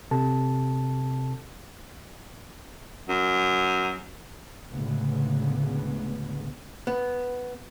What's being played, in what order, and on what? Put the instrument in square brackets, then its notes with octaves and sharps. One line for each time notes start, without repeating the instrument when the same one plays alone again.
[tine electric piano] C3 A4 A5
[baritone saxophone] F#2
[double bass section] D2 A2 C#3 G#3 B3
[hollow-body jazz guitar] B3